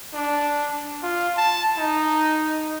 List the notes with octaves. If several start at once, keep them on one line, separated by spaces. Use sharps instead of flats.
D4
F4
A5
D#4